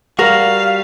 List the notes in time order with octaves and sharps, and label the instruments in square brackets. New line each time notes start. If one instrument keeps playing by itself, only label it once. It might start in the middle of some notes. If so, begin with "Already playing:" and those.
[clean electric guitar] G3 F#4 [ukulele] A#4 [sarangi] F5